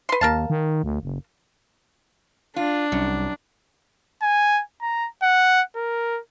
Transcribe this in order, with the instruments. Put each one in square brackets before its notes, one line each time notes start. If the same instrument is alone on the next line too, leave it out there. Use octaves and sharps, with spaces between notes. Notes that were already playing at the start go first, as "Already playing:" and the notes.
[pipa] B4 C6
[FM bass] D#2 [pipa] A#4 F5 A5
[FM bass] D#3
D2
F#1
[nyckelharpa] D4 [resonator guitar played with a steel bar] F4
[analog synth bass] C2 [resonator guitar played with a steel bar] F#2
[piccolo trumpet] G#5
A#5
F#5
A#4